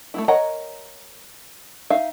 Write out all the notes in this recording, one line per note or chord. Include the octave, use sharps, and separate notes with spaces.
A3 A#3 E4
A#4 C#5 D#5 F#5 A#5
D#4 E5 F5